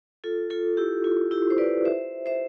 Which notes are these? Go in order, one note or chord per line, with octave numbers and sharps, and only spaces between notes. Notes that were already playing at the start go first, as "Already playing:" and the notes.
F4 A4
F4 A4
E4 G4
F4
E4 G4
C5
B4 D5
C5 E5
C5 E5